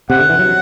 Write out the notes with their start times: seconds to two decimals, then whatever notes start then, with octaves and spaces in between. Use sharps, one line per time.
0.10 C3 F#5
0.19 D3
0.29 E3
0.39 F#3